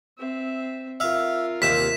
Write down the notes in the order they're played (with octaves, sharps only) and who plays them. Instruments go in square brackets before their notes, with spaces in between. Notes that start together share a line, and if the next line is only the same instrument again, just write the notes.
[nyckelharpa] C4 E5
[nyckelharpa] F4 A#4 [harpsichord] E5 F5
[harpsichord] D#2 C3 [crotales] B6 E7